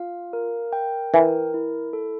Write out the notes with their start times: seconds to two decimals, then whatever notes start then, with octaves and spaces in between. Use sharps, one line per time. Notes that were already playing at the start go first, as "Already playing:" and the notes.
Already playing: F4 F5
0.33 A#4
0.73 G5
1.14 E3 A#4
1.54 E4
1.93 A4